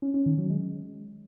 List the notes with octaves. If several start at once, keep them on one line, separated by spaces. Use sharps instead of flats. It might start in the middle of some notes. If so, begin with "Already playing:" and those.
C#4
C#4
D#3
F#3
G#3